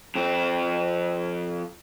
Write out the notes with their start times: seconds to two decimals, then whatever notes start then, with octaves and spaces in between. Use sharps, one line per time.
0.15 F2 C4